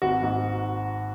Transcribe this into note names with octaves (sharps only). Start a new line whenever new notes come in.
G#1 F#4
G#2